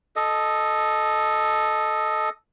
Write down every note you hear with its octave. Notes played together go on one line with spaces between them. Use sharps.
A4 D#5